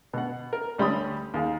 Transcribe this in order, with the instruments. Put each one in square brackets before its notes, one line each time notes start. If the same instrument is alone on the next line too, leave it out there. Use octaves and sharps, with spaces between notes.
[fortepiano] B2 F#5
A#4
D2 G3 A3 C#4 B5 D#6
D#2 G#4 F5